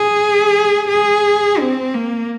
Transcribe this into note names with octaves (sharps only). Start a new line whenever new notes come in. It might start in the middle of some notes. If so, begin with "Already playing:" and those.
Already playing: G#4
G#4
C4
A#3